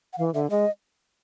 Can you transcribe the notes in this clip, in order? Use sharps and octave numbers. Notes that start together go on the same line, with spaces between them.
F#5
E3 F5
D3 E5
G#3 D#5